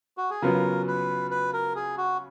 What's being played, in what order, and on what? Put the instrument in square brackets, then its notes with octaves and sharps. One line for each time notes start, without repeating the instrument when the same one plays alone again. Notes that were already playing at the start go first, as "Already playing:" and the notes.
[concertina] F#4
G#4
[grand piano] C#3 F#3 B3 F4 [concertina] A#4
[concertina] B4
B4
A#4
G#4
F#4